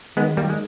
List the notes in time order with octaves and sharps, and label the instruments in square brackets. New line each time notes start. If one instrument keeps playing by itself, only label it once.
[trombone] D#3 [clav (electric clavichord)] G#3 B3
[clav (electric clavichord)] G3 A#3
G#3